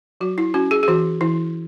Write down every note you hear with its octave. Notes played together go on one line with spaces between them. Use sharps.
F#3 F#4
E4
C#4 F#4
G#4
G#4
E3 F#4
E3 E4